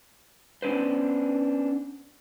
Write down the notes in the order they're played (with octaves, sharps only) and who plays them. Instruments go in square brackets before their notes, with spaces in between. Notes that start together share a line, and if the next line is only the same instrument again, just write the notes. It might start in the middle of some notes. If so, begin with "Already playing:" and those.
[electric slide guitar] B3 C#4 D4 B4 C5